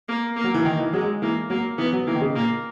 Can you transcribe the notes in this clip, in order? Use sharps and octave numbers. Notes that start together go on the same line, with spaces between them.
A#3
A#3
F#3
E3
D#3 A#3
E3
F#3 G#3
E3 A#3
F#3 A#3
E3 B3
F#3
E3 A#3
D#3
C#3
A#2 A#3